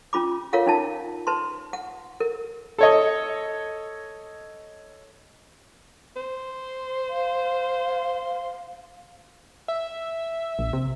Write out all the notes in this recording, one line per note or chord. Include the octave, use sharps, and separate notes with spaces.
C#4 F4 B5 D6
F4 A#4 C#5 F5 F#5
C#4 D#4 A5
B4 A5 C6
F#5
A#4
A4 C#5 D#5
C5
F5
E5
A#1
C3